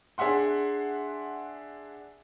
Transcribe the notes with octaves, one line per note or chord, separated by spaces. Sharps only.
D4 G#4 E5 F#5 C6